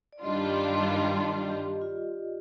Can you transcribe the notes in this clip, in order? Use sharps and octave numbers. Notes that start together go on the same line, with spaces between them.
D5
G2 D#3 G3 D4 F4 D#5
D#5
D#5
D5
G4
F4